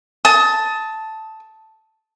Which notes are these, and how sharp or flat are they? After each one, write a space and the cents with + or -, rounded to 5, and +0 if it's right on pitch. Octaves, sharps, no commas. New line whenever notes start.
A5 +0 D#6 +30